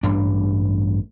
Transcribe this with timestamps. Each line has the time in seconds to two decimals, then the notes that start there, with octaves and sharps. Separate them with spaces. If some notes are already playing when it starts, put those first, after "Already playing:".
0.03 A1 G2 D4